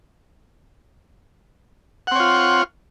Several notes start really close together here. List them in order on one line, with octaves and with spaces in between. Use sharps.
F#5 C4 C#5 F4